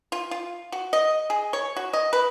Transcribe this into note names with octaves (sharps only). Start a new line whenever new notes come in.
F4
F4
F#4
D#5
G#4
C#5
F#4
D#5
B4